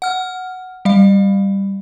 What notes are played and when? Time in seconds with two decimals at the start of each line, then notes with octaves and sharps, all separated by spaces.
0.02 F#5 F6
0.85 G3 F5